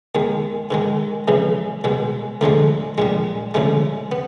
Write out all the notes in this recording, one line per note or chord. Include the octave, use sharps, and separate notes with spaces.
D#2 D#3 G#3
G#2 D#3 G#3
F2 C#3 E3 G#3
C2 B2 G#3
D2 D3 F3 G#3 A3
A#1 A#2 G3 G#3
D2 C#3 F3 G#3 A3
B3